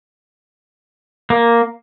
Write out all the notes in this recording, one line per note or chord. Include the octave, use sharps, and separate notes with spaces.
A#3